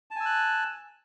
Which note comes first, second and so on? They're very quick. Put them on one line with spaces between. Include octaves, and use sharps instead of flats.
A5 G#5 E6 F#6